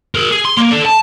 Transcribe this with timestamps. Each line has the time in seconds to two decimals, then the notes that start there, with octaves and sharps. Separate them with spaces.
0.15 G#4 A#4
0.31 G#4
0.45 C6
0.57 A#3
0.71 A4 D5
0.86 A5